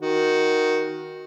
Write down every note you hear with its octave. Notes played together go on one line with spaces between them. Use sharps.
D#3 F#4